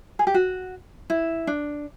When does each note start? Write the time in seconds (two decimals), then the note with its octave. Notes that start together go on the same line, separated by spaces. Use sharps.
0.19 G#4
0.27 G4
0.34 F#4
1.10 E4
1.47 D4